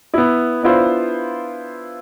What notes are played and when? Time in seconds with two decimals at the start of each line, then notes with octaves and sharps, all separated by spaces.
0.14 B3 E4
0.63 B3 D4 E4 F4 C5